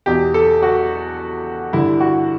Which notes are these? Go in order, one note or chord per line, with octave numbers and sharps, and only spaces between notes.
E2 B2 G4
A4
F#4
G2 D3 E4
F#4